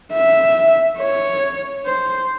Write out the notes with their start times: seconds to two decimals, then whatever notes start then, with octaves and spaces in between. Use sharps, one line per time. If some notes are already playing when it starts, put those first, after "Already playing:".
0.13 E5
1.00 C#5
1.86 C5